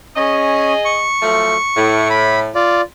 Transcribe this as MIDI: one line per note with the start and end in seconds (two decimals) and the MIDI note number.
0.16 0.73 61
0.16 1.08 68
0.16 1.08 75
0.85 2.08 85
1.22 1.56 53
1.22 1.56 54
1.22 1.56 57
1.76 2.51 45
2.10 2.40 83
2.55 2.81 65
2.55 2.81 74